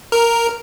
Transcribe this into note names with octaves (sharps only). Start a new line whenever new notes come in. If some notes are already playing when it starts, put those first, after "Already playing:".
A#4